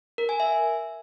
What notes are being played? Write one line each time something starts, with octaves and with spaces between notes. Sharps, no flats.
A#4
G#5
E5